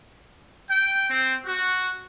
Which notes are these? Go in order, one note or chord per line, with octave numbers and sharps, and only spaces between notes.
G5
C4
F#4